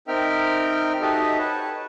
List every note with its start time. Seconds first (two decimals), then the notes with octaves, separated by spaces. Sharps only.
0.08 C4 D#4 A#4 E5 G5 F6
1.01 D#4 F#4 G4 A4 D#5 E5
1.38 B4 C#5 A5